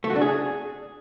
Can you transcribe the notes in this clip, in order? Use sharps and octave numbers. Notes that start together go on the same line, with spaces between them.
A3
F#4
D4
G#4